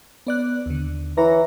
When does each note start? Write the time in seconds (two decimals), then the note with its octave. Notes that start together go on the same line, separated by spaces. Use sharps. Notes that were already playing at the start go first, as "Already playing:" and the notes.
0.27 B3 D5 F#6
0.66 D#2 D3
1.18 E3 E4 C#5 A#5